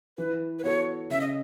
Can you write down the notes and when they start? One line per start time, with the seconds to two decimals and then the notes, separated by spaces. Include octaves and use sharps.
0.17 E3 B4
0.59 B4
0.64 B3 F#4 A4 C#5
1.10 C#3 E5
1.21 D#5